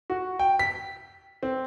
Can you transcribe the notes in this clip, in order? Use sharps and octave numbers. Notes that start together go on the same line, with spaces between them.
F#4
G5
B6
C4